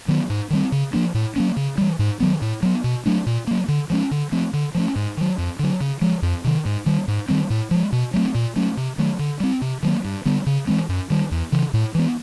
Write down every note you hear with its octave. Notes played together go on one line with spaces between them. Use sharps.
D#3 F#3 B3
G#2
D#3 G3 C4
C#3
F3 A#3 D4
A2
F#3 A#3 C#4
C#3
E3 G3
G#2
D#3 F#3 B3
A2
F#3 B3
B2
F#3 A3 D4
A#2
F#3 A#3
D3
F3 G#3 C#4
D3
F3 A3 C4
D3
F3 A3 C#4
G#2
D#3 F#3
F2
D3 F#3
C#3
F3 G#3
F2
C3 D#3
G#2
D#3 G3
G#2
D#3 G3 C4
A2
F3 G#3
B2
F#3 A3 C4
A#2
F#3 A3 C#4
C3
D#3 F#3 A3
D3
G3 C4
C3
D#3 F#3 A#3
G2
D3 G3 B3
C#3
E3 G#3 C4
F#2
D#3 G3
E2
C#3 E3
A2
E3 G#3 B3